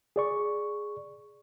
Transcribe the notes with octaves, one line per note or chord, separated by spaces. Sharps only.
G#4 D5 C#6